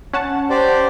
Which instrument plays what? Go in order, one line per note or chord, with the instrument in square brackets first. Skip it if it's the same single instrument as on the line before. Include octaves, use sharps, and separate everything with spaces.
[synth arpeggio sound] C#4 F#5 A5
[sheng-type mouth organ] G4 C5 D5